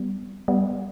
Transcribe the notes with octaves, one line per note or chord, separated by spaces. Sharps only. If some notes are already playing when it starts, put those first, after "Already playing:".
Already playing: G3 B3
G3 B3